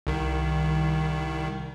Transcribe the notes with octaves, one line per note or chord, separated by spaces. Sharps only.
C2 D#3